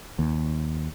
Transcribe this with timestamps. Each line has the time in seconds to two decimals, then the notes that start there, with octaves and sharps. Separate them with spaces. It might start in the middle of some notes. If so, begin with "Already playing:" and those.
0.19 D#2